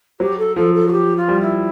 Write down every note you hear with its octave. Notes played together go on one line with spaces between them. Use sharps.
F#3 G4
A4
F3 A4
A4
F#4
G4
F4
G3
E4